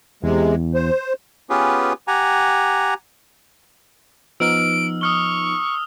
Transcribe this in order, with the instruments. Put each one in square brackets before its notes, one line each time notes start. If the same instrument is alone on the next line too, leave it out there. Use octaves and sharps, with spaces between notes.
[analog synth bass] E2 [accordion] C3 G#3
[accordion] C5
[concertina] B3 C#4 F4 G4 G#4 B4
G4 F#5 G#5 A#5
[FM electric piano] F3 B3 D#4 [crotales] E6 F6 [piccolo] D7
[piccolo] C#6 [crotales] D#6 F6 G7